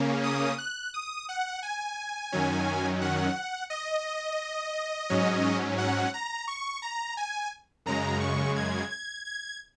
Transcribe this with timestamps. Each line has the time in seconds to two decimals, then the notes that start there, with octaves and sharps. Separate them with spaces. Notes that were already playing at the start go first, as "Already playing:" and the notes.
Already playing: C#3 A#3 C#4
0.24 D#6
0.58 F#6
0.94 D#6
1.29 F#5
1.63 G#5
2.32 F#2 D#3 F#3 C#4
3.01 F#5
3.70 D#5
5.10 G#2 F#3 C#4
5.78 F#5
6.14 A#5
6.48 C#6
6.82 A#5
7.17 G#5
7.86 F#2 C#3 G#3 A#5
8.20 C#6
8.56 G#6
8.90 G#6
9.25 G#6